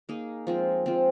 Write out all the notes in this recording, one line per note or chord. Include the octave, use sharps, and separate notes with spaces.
A#3 D#4 G#4
F3 G#3 C4
F3 G#3 C4